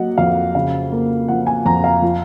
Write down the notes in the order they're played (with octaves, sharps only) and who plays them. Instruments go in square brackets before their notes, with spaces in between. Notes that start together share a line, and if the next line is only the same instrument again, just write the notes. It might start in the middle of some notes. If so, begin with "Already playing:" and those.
Already playing: [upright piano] F#3 A#3 D#5 F#5
F2 F5
C#3 F5
A#3
F3 F#5
G#5
F2 A#5
F5
F3